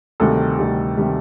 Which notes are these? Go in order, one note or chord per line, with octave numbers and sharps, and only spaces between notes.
D2 C3 D#3 G3 A4
D2 C3 D#3 G3
C3 D#3 G3